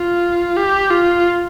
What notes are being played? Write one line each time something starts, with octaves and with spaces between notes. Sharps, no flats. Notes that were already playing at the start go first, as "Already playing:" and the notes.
Already playing: F4
G4
F4